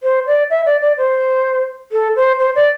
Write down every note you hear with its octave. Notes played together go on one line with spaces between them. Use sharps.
C5
D5
E5
D5
D5
C5
A4
C5
C5
D5